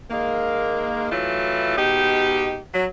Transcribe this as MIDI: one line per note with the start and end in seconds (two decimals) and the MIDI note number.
0.11 1.11 51
0.11 1.11 56
0.11 1.11 58
1.12 1.75 52
1.12 1.75 54
1.12 1.75 57
1.12 1.75 64
1.12 1.75 65
1.78 2.59 47
1.78 2.59 56
1.78 2.59 63
1.78 2.59 67
2.74 2.86 54